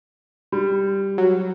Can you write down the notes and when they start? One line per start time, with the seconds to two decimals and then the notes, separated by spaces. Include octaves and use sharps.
0.52 G3
1.18 F#3